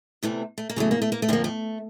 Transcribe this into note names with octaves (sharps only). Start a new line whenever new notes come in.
E2 C3 E3 A3
A3
A#3
E2 C#3 F#3 A3
A#3
A3
A#3
A3
F2 D3 F3 A#3
A3